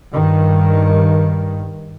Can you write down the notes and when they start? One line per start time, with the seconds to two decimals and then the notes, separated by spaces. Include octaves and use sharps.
0.12 G2 D#3